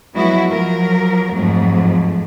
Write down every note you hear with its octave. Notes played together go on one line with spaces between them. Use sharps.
F3 F#3 G#3 B3 E4 F#4
F3 F#3 A#4
F2 G#2 F3 F#3 A3